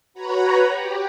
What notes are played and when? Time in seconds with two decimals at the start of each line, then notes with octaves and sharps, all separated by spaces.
0.14 F#4 B4 C#5 A#5 B5
0.66 G4